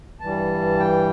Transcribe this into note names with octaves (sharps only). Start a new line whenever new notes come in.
G2 E3 G3 A5
G5